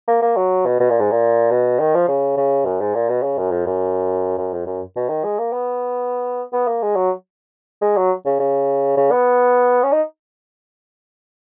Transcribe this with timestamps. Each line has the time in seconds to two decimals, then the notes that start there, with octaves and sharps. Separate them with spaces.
0.08 A#3
0.22 A#3
0.37 F#3
0.66 B2
0.80 B2
0.90 A#2
1.00 G#2
1.11 A#2
1.51 B2
1.80 D#3
1.95 F3
2.08 C#3
2.37 C#3
2.65 F#2
2.80 G#2
2.95 A#2
3.09 B2
3.23 C#3
3.38 F#2
3.51 F2
3.66 F#2
4.38 F#2
4.53 F2
4.66 F#2
4.96 B2
5.09 D#3
5.24 G#3
5.39 A#3
5.52 B3
6.53 B3
6.68 A#3
6.82 G#3
6.96 F#3
7.82 G#3
7.97 F#3
8.25 C#3
8.40 C#3
8.97 C#3
9.11 B3
9.83 C#4
9.92 D#4